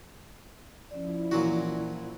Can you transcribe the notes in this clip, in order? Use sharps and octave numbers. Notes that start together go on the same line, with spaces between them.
F3 C#4 E4 D5
A#2 E3 F#3 F#4